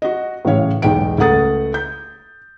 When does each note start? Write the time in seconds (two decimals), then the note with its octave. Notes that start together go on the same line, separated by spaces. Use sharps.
0.02 F#4 D#5
0.45 A2 C#3 E3 C#5 F5
0.82 B1 E2 G#3 G5 D7
1.18 C#2 A3 F#5 D#6 A6
1.74 G6